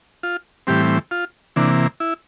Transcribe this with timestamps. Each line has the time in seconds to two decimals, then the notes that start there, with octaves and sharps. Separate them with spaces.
0.23 F4
0.67 A2 E3 G3 C4 G4
1.11 F4
1.56 C3 E3 A#3 D4
2.00 E4